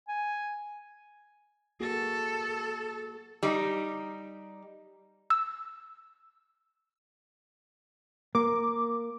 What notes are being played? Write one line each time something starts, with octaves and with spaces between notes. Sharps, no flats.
G#5
A#3 F#4 G#4 A4
G3 D#4
E6
A#3 D6